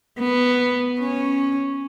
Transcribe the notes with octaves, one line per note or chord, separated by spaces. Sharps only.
B3
C#4